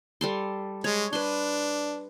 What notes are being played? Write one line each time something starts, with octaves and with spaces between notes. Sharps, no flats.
G3 A4 C6
G#3 C#5
D4 B4 C6